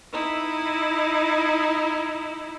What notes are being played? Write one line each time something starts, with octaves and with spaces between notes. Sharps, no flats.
D#4 E4